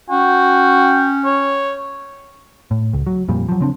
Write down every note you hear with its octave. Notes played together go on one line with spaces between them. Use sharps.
C#4 F#4 G5
C#5
A2
C#2
F#3
F2 A#2 G3
F3 F#3
C#3 C4 D4